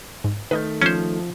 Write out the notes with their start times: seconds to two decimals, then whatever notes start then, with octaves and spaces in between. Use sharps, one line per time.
0.24 G#2
0.51 D#3 A3 B4 D#5 G6
0.82 F3 C#4 C5